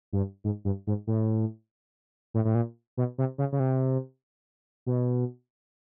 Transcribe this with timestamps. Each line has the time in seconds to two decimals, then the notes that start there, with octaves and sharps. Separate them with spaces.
0.13 G2
0.44 G#2
0.65 G2
0.87 G#2
1.07 A2
2.34 A2
2.45 A2
2.55 A#2
2.97 B2
3.18 C3
3.38 C#3
3.52 C#3
3.60 C3
4.86 B2